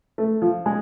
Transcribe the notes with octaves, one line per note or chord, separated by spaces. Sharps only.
A3
F3
G#3